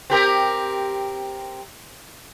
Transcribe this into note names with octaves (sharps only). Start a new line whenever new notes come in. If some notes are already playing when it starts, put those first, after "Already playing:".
C4 G4 A#4